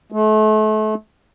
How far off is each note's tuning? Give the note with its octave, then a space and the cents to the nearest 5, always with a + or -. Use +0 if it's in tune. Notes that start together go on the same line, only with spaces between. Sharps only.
A3 -35